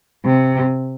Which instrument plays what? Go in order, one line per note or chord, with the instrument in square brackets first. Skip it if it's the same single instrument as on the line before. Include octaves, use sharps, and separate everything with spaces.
[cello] C3